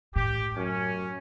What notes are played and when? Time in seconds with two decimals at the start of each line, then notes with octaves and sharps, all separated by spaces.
0.16 A2 G4
0.57 F#2 C#4